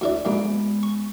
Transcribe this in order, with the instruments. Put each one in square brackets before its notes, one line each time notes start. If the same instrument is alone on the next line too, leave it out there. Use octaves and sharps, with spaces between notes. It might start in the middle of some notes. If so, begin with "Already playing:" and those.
[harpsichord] D2 E4 D5
[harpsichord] B1 G#2 A#3 [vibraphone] G#3 B3
[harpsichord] C#6